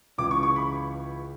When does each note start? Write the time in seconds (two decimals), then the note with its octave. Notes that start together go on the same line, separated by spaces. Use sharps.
0.18 C#2 C#3 E3 D6
0.31 C#6
0.43 C#6
0.56 B5